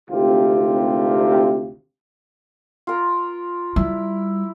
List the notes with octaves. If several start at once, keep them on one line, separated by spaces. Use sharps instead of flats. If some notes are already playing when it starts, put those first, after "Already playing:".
G#1 D2 C3 F4 G4
F4 A#4
G3 E4